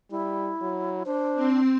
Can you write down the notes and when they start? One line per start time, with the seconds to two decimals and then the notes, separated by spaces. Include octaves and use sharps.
0.11 G3 E4
0.61 F#3
1.06 D4 C5
1.35 C4 C6